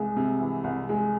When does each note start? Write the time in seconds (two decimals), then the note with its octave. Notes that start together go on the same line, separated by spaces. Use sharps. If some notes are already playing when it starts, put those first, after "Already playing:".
Already playing: C2 E3 G#3
0.16 C3
0.40 E3
0.64 C2
0.89 G#3